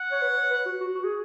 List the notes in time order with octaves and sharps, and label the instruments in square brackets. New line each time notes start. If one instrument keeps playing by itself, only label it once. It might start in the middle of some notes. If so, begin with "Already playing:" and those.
Already playing: [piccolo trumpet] F#5
[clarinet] C#5
B4
C#5
B4
F#4
F#4
F#4
G#4